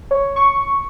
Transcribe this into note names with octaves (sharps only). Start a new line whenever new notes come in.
C#5
C#6